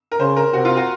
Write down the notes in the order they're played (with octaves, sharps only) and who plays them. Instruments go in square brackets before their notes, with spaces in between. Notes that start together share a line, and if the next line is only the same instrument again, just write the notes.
[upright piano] A#4
[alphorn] C#3 [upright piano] C5
[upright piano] A#4
[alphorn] C3 [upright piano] F#4
[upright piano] F4
F#4